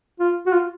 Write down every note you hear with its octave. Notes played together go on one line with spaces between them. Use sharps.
F4
F#4
F4